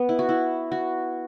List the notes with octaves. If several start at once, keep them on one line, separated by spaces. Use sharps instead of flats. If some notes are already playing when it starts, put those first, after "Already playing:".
Already playing: B3
E4
F#4
E4
F#4